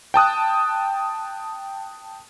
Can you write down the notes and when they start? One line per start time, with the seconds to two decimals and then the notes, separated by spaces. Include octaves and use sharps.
0.14 G5 A5 D#6 F#6